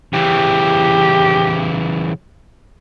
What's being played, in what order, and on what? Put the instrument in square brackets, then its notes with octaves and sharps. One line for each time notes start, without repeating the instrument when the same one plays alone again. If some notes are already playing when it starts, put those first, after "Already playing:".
[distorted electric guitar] C#3 E3 [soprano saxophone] G4